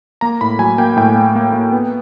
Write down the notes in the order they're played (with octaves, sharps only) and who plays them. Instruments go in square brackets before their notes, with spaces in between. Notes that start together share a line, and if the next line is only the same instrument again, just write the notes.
[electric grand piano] A#3 A#5
A2 B5
F#3 G#5
A#3 G5
A2 G5
A#3
A#3
A#3
B3